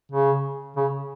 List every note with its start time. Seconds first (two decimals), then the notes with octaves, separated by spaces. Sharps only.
0.12 C#3
0.76 C#3